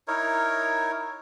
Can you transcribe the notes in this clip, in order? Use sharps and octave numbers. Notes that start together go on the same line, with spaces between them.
D#4 E4 A#4 C#5